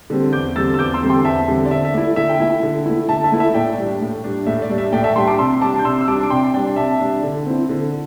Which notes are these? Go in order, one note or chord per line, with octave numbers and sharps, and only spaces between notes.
D3 G3 C4
E2 D6 G6
D3 G3 C4 E6 A6
E6
E2 D6 G6
C6 E6
D3 G3 C4
G5 C6
E2 E5 A5
D3 G3 C4
D5
D3 E5
E5
A3 E4 D5
D3 E5
G5
A3 E4 E5
D3
A3 E4
D3 E5 A5
E5 A5
A3 E4
E5
A2 D5 G5
G3 D4
A2
G3 D4
A2 E5
D5
G3 D4
E5
A2 D5 G5
E5 A5
G3 D4 G5 C6
A5 D6
C3 C6 E6
G3 D4 A5 D6
G6
C3 C6 E6
E6
G3 D4 A5 D6
D6
C3 G5 C6
G3 D4 D5 G5
C3 E5 A5
G3 D4
D3
C4 E4
D3